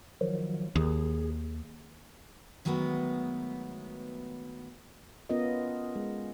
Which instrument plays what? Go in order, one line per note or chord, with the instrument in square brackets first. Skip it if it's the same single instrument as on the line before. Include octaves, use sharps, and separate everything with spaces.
[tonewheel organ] D#3 F3 F#3
[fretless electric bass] D#2 [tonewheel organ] G#4
[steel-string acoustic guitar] D#3 F#3 G#3 A3 B3
[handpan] B3 C#4 F4 A#4 D#5
G#3